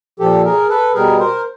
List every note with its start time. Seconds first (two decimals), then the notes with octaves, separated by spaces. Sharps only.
0.19 A#2 F3 G4 A4
0.44 G#4 A#4
0.69 A4 B4
0.94 B2 G3 G#4 A#4
1.19 A#4 C5